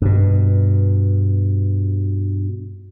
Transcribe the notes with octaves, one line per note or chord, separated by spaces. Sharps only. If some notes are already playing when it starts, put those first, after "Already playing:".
G2 B2